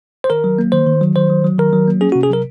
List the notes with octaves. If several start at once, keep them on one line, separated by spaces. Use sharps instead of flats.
C5
D#3 A#4
F#3
A#3
D#3 C5
D#3
F#3
D#3 C5
F#3
F#3
D#3 A#4
F#3
A#3
C#4 G#4
F#4
C3
G#4
F#3 A#4